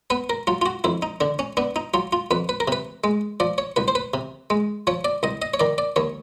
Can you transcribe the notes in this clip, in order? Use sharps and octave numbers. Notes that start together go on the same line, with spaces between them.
B3 B4
A#4
F#3 F4
F4
F#4
F2 E4
D#4
D3 D4
C#4
B3 D4
D#4
F#3 F4
F4
F2 B4
B4
A#4
C3 B4
G#3
F3 D5
C#5
C2 B4
C5
B4
C3
G#3
F3 C#5
D5
C2 D#5
D#5
C#5
D#3 D5
D5
D#2 C#5